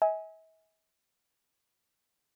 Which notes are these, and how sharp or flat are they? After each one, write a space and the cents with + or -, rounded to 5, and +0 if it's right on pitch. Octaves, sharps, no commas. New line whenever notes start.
E5 -45 G#5 +0